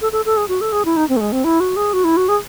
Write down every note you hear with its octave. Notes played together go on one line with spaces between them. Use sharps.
A4
A4
A4
G#4
F#4
A4
G#4
E4
D#4
C4
A3
G#3
C4
E4
F#4
G#4
F#4
E4
F#4
G#4